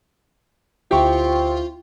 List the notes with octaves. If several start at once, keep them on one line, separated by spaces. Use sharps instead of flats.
D2 C4 E4 F4 G4 G5 C#6